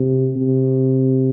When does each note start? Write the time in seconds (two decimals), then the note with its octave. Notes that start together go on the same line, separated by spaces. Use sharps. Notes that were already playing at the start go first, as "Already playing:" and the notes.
Already playing: C3
0.36 C3